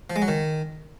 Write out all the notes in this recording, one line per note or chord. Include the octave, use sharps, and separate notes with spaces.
F3
G#3
F#3
D#3